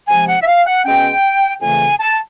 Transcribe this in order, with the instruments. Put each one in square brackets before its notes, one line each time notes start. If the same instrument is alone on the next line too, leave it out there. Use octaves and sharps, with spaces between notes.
[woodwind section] C3 F3 G#3 G#5
F#5
E5
F5
F#5
B2 G#3 C#4 G5
F2 C#3 E3 A3 G#5
A5